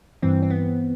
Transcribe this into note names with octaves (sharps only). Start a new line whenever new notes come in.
G2 E3 C4
C4
B3